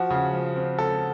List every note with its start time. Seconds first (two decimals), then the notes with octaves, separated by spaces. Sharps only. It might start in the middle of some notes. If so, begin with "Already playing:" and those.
Already playing: F3 F#4
0.10 C#3
0.33 F3
0.56 C4
0.78 C4 A4